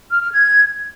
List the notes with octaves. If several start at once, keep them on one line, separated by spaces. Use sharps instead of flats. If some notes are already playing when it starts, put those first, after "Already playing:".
F6
F6
G#6